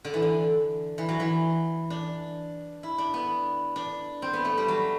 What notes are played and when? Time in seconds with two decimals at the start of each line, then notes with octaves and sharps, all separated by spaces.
0.05 D3
0.14 E3
0.22 D3
0.98 E3
1.09 F#3
1.20 E3
1.90 D4
2.83 E4
2.98 D4
3.14 B3
3.76 D4
4.22 C4
4.33 B3
4.45 A3
4.57 G3
4.68 F#3